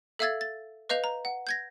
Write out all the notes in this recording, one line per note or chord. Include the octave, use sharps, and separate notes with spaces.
A4 E5 F5 E6 G#6 A6
A6
B4 D#5 F5 G6 F7
A#5
F#5
G6 G#6 A#6